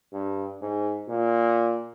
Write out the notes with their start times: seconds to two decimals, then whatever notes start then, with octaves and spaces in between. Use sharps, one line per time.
0.13 G2
0.61 G#2
1.09 A#2